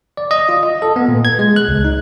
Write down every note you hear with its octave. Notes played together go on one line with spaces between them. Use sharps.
D5
D#5
F4
D#5
A4
B3
A#2
G#6
G#3
F#6
C#2
D#4